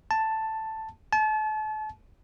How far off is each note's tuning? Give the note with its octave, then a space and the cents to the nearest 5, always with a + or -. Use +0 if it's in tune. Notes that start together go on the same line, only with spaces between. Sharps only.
A5 +5
A5 -35